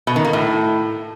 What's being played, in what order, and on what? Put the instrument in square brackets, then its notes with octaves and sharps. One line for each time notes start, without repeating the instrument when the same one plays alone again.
[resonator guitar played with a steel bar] B2
D#3
A#3
A2